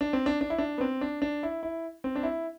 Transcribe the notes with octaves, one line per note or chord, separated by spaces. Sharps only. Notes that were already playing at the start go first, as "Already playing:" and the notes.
D4
C4
D4
D4
E4
D4
B3
C4
D4
D4
E4
E4
C4
D4
E4